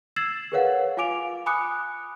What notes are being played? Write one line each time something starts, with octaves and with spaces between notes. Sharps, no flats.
E6 G#6 A6 C7 E7 F#7
G#4 A#4 B4 C#5 F5 F#5
F4 F5 G#5 D6 D7 F7
G#5 B5 D6 D#6 F#6 C#7